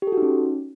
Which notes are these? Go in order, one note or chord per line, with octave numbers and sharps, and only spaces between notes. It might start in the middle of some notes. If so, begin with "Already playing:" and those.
G4
A4
F#4
D#4
C#4